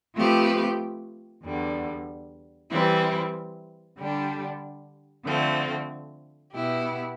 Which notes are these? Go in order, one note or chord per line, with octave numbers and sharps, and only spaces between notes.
F3 A3 C4 G4 B4
E2 D3 G3
E3 G3 C4 E4
D3 G3 D4 G4
D3 F3 A3 C4
B2 B3 E4 G4